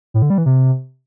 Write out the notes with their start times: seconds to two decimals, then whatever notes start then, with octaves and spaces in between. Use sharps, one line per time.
0.14 A2
0.22 D3
0.30 G3
0.38 E3
0.46 C3